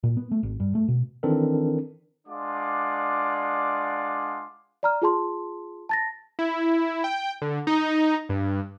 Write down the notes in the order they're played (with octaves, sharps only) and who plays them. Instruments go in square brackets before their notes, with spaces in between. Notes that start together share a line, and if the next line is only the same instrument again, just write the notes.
[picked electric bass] A#2
B3
A3
G#1
G2
A3
B2
[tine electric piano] D#3 E3 C4 D4 A4 A#4
[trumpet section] G#3 D4 F4 D5 F#5 D6
[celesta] D5 A#5 F6
F4 G#4 A5 C6
A5 A6 A#6
[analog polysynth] E4
G5
D3
D#4
G2